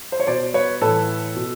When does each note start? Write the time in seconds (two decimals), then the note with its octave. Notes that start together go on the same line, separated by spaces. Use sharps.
0.12 C5
0.20 C#5
0.27 B2 C5 D5
0.54 B4 C#5
0.81 A2 E3 A4 B4
1.36 B2